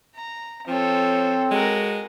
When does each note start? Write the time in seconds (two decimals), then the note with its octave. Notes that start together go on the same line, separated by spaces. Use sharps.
0.15 A#5
0.67 F3 C4 A4 C#5
1.51 G#3 F#4 A#4